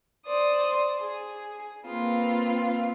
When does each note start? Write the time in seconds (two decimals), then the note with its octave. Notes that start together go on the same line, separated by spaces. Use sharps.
0.25 C5 D5 D#6
1.00 G#4
1.85 A#3 C4 F4 B4